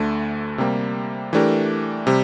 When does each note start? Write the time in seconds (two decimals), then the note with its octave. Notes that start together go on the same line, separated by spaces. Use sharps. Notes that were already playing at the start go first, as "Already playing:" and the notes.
Already playing: D2 D3 A3
0.58 C3 G3 A#3
1.33 E3 A3 D4 G4 A#4
2.07 C3 G3